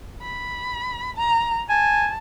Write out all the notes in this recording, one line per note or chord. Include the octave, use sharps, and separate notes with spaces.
B5
A#5
G#5 A5